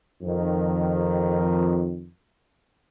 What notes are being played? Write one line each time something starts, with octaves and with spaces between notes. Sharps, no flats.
F2 D#3